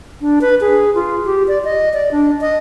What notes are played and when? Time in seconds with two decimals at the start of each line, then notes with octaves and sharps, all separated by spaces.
0.21 D4
0.41 B4
0.61 G#4
0.95 F4
1.25 G4
1.48 D5
1.64 D#5
1.94 D5
2.12 D4
2.41 D#5